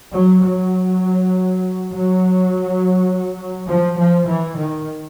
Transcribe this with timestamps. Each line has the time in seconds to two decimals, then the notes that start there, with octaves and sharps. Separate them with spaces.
0.13 F#3
0.43 F#3
1.91 F#3
3.69 F3
3.98 F3
4.28 E3
4.57 D#3